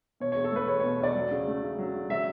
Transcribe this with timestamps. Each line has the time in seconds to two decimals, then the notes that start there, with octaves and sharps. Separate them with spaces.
0.20 B2 C#5
0.32 E2 C#5
0.44 A4
0.52 A3 B4
0.68 E2 C#5
0.80 B2 C#5
1.00 E2 D5
1.15 F#3
1.31 C#3
1.47 A3
1.63 C#3
1.78 F#3
1.94 C#3
2.09 F#3 E5